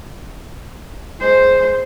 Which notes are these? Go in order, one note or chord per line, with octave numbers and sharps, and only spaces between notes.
G#3 C5